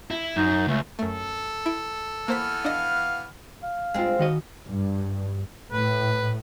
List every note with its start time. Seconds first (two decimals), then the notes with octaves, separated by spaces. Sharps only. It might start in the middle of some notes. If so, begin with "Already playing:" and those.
0.11 E4
0.36 F#2 D#4
0.68 C#2 A3
0.99 F#2 A3 A4
1.66 E4 D7
2.28 E3 A#3 B3 C5 F6 B6
2.65 D4 D#5 F5
3.63 F5
3.94 G2 G#3 C4 F4
4.19 D#3 F#4 D#5
4.68 G2
5.73 A2 B4